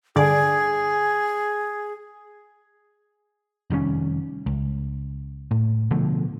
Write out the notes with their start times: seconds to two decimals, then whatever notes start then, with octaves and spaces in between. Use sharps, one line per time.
0.16 G2 D3 G#4 D5
3.70 F1 D#3 G3 C#4
4.46 C#2
5.51 A2
5.91 B2 D3 F3 A3